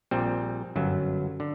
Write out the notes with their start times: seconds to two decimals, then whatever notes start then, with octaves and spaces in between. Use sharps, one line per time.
0.11 A#1 A#2 G3 C4
0.76 G1 F#2 F#3
1.40 D3